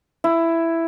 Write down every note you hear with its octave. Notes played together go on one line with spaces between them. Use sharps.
E4